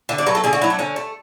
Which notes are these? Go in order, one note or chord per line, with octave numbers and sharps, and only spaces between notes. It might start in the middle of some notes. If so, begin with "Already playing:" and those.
D3 E5
D5
F#3 A3 B4
A4
D3 G#4
F#4
F#3 A3 E4
D4
D3 C#4
A3